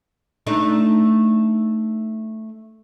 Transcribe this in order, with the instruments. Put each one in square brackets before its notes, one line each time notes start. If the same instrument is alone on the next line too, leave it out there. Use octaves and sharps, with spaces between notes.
[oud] A3 D4 D#4